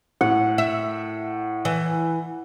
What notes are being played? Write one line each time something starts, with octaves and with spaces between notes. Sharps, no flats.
A2 F#5
E5
E3